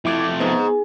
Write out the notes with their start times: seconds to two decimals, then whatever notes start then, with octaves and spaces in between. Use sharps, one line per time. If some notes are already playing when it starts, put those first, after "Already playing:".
0.05 F2 A3 E4 D6 G#6
0.40 G#2 B3